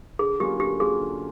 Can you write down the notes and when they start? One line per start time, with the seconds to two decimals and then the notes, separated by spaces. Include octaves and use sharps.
0.19 D3 G#4
0.40 F#3 A#3 C#4 F4 G4
0.60 D3 G4
0.80 F#3 A#3 C#4 F4 G#4
1.01 D3